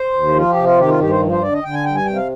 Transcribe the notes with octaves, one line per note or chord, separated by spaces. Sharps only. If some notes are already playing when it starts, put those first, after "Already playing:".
Already playing: C5
D#2
F3 F4
G4
C3
F4
D#3 G4
F4
G2 G4
C5
F3
C5
D3 D5
D#5
D3 G5
G#5
G2 G5
G#5
C3 G5
F5